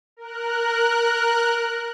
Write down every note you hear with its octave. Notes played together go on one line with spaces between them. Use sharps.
A#4 F#6